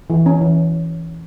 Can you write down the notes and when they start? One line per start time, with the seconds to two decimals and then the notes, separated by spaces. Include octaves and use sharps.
0.10 E3
0.26 C#4
0.41 E3